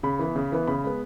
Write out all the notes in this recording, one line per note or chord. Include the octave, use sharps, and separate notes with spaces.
C#3 B5
E3 B3
C#3
E3 B3
C#3 B5
G#3 B3